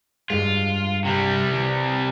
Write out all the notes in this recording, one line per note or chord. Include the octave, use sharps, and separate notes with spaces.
G2 G#3 F4
C3 G3
E3